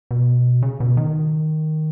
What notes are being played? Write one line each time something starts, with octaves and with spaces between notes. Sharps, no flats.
B2
C#3
B2
D#3